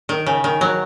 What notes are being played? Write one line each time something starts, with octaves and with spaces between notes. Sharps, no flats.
D#3
C#3
D#3
F#3